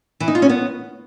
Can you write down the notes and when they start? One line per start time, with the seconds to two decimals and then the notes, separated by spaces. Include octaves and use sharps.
0.20 E3
0.28 D#4
0.35 F4
0.42 C#4
0.49 B3